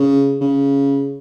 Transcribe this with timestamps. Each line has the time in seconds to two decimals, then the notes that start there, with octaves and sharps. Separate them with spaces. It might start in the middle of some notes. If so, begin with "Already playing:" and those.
Already playing: C#3
0.41 C#3